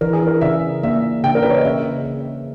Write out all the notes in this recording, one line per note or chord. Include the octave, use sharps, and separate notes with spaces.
E3 A#4
G#4
A#4
C#3 E5
A#3 E5
C#3 G5
A#4
B4
C#5
D#5
C#3 E5
C#3